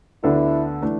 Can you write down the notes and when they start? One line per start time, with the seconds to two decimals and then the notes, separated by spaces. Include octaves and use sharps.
0.23 D2 D3 B3 D4 E4 A4
0.82 E3 A3 D4